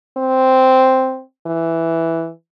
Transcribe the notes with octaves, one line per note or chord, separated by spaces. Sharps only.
C4
E3